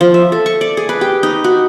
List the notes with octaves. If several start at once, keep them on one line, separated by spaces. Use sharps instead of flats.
F3
E5
A4
C#6
D5
G#4
B4
G4
D#4
F#4